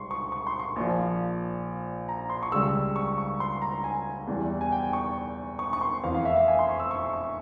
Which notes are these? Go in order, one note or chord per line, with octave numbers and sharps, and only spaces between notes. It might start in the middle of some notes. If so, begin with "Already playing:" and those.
Already playing: C#2 C3 G3 C6 C#6
C#6
C#6
C6
C#6
A#1 A#2 F3
A#5
C6
C#6
C#2 C#3 G3 E6
C#6
C#6
C6
A#5
A#5
G#5
E2 E3 G3
G#5
G5
C#6
C#6
C#6
C6
F1 F2 E3 F5
F5
E5
F5
G#5
C6
C#6
E6
C#6
C#6